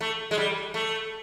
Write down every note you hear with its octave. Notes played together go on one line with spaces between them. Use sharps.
A3
G#3
G3
A3